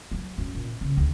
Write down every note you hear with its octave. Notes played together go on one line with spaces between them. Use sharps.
F#3
F#2
A#2
C#3
D2